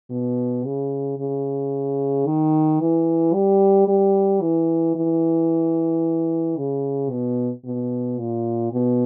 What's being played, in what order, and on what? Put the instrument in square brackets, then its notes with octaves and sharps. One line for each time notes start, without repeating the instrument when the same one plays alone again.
[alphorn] B2
C#3
C#3
D#3
E3
G3
G3
E3
E3
C#3
B2
B2
A#2
B2